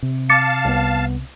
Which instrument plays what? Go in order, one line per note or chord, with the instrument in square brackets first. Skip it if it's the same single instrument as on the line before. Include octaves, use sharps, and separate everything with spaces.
[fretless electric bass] C3
[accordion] F5 A5 [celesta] D6 A6 C#7
[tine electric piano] C2 B3